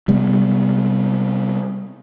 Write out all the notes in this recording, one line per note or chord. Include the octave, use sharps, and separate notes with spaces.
C3 G3 G#3 B3